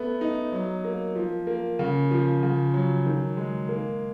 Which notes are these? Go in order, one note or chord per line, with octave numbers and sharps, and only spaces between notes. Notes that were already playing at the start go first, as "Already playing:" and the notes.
Already playing: A3 B3
D#4
F#3
A#3
F3
A#3
C#3
F3
C#3
F#3
D#3
G#3
A#3